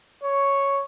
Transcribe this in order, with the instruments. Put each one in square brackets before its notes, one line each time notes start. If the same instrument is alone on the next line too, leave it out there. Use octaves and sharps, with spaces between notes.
[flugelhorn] C#5